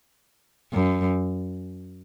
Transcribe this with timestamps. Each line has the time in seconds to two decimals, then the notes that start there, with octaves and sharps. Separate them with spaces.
0.73 F#2